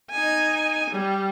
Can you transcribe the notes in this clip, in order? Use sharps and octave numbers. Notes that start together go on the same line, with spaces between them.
D#4 G#5
G3